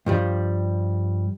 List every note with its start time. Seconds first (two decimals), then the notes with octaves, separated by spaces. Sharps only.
0.06 G2 F3 G3